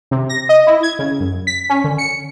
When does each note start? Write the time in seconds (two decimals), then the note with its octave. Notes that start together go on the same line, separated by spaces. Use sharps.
0.11 C3
0.29 A#6
0.49 D#5
0.67 E4
0.83 G#6
0.99 C#3
1.20 F#2
1.47 B6
1.70 C#4
1.84 D3
1.98 C#7